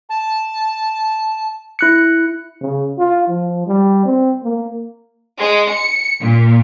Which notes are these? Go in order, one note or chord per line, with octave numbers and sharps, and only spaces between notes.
A5
E4 F#6 C#7
C#3
F4
F3
G3
C4
A#3
G#3
C#7
A#2